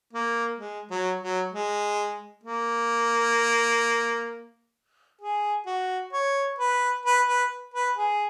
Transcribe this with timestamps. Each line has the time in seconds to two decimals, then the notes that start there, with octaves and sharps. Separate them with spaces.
0.13 A#3
0.59 G#3
0.91 F#3
1.20 F#3
1.52 G#3
2.43 A#3
5.21 G#4
5.66 F#4
6.13 C#5
6.59 B4
7.05 B4
7.28 B4
7.74 B4
7.97 G#4